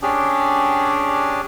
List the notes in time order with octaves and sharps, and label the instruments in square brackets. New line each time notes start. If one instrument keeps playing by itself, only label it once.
[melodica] C#4 D4 G4 G#4